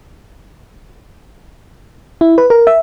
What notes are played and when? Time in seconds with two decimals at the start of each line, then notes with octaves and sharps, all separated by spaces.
2.21 E4
2.38 B4
2.50 A#4
2.67 E5